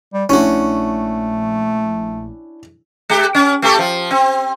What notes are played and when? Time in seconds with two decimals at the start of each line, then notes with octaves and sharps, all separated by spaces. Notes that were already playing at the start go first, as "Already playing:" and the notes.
0.13 G3
0.29 A#1 A3 C#4 D4 E4 F#4
3.10 G#3 G4
3.35 C#4
3.62 A3 G4 A4
3.79 F3
4.11 C4